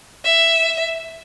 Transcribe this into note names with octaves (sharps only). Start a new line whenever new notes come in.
E5